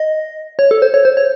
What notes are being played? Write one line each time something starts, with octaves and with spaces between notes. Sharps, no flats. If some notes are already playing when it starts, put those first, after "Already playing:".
Already playing: D#5
C#5
A4
C5
C#5
C5
C#5